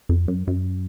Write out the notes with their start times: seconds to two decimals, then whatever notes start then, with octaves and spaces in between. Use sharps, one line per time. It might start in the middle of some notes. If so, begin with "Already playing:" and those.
0.09 F2
0.28 F#2
0.47 F#2